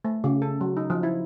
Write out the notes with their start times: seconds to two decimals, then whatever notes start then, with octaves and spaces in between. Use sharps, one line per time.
0.05 A3
0.24 C#3
0.42 A4
0.61 F#3
0.77 D#4
0.90 F3
1.03 E4